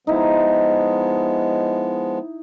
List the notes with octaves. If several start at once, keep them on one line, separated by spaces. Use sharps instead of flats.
F3 G#3 B3 D#4 E4